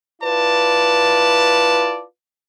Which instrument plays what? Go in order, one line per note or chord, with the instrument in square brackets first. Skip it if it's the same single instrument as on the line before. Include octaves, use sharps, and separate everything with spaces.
[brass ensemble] E4 F4 B4 D5 A5